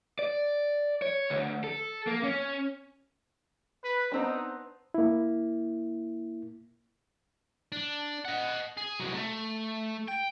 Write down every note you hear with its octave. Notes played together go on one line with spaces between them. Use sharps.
D5
C#5
D2
A4
A#3
C#4
B4
B3 C4 D4 D#4
A#3 E4
D4
D#5 F#5
G#4
C2 F#3
A3
G5